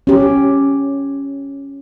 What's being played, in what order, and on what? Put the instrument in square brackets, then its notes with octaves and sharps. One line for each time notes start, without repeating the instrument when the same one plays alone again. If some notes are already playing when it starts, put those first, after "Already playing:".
[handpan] C#4 G4